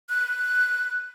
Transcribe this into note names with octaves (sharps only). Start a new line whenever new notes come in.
F#6